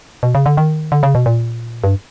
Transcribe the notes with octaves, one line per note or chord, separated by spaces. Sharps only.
B2
C#3
D3
D#3
D3
C#3
B2
A#2
G2